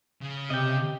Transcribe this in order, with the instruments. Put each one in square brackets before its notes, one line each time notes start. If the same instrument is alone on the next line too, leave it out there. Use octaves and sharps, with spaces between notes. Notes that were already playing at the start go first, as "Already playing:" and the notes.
[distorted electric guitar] C#3
[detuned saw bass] C3 [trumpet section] G4 [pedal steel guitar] D#5 G5